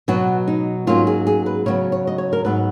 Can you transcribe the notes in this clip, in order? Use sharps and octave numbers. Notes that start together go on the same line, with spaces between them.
B2 F#3 B3 F#4
D#4
G#2 F#3 A#3 C#4 F4
G#4
G#4
B4
C#3 F#3 B3 C#5
C#5
D#5
C#5
A#4
G#2 F#3 B3 B4